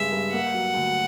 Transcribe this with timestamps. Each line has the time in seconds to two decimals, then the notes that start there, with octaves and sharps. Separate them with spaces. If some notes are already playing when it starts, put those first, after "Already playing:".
Already playing: G2 C#3 G#3 E5
0.12 G2
0.33 A#3 F#5
0.54 F#3
0.74 D2